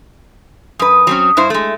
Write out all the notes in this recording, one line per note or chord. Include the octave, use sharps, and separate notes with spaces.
F#2 B4 D#6
F#3 C4 C#4
G2 E4 C5
G#3 A3